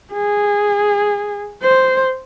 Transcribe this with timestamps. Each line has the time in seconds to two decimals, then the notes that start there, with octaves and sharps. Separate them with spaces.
0.13 G#4
1.63 C5